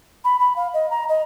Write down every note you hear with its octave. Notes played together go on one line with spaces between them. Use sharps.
B5
B5
F5
D#5
A#5
D#5